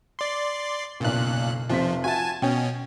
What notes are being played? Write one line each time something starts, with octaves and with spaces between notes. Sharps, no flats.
D5 C6
F#1 B1 A#2 F#6
F1 C3 F3 B6
F4 F#4 E5 G#5 A5
B2 C#4 G5